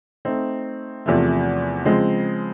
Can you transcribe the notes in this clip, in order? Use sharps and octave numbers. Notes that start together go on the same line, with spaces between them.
A3 C4 D#4
E2 C3 F3 A3
C#3 F3 G#3 C4